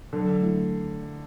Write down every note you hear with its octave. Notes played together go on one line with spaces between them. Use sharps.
D3 F#3
A3 E4